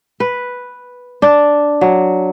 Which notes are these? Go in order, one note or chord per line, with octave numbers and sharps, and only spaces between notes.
B4
D4
F#3